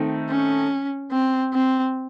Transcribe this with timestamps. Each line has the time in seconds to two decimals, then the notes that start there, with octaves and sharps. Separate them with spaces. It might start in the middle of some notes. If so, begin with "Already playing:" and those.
Already playing: D#3 A3 C4 D#4
0.29 C#4
1.12 C4
1.53 C4